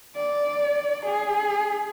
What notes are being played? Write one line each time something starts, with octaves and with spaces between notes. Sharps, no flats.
D5
G#4